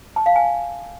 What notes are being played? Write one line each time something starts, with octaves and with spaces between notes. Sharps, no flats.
A5
F5
G#5